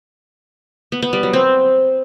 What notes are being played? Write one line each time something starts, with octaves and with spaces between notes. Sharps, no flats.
B3
B3
G3
F#3
C4